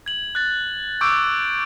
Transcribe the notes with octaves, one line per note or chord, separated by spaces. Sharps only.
G#6 F#7
F#6 G#6 A6
C#6 D6 E6 G6 A6 D7